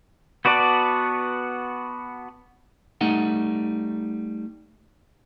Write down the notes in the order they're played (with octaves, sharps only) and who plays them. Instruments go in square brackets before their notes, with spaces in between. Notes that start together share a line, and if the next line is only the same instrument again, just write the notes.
[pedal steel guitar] B3 F#4 B4 D5 A5
[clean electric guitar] G3 A3 D#4 F#5